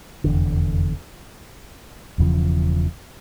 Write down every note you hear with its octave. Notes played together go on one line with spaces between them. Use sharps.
F1 E2 D3
E1 E2 C#3 F3